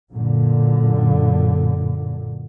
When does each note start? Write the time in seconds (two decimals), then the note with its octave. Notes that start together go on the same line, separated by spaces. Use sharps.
0.13 F#2 A#2 D3